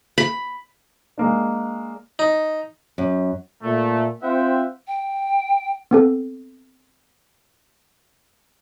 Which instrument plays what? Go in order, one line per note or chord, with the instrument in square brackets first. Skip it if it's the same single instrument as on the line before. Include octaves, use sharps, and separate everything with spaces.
[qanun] B5
[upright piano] G#3 A#3 D4
[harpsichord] D#4
[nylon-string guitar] F#2
[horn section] A#2 A3
C4 F4 C5 E5 F#5 G5
[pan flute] G5
[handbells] B3 C4 A4